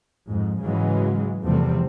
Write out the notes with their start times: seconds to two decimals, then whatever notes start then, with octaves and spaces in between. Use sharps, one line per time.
0.29 F2 G#2
0.62 G#2 C#3 E3 F#3 G#3
1.45 E2 C3 F3 G3 A3 C4